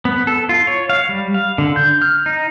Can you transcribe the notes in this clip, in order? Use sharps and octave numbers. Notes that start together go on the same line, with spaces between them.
B3
A4
F4
C#5
F5
G3
F5
D3
G6
F6
D#4